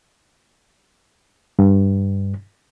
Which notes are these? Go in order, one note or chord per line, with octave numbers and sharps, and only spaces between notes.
G2